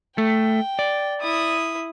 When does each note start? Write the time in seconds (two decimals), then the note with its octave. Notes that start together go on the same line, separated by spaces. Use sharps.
0.18 A3 G5
0.79 D5
1.21 E4 D#6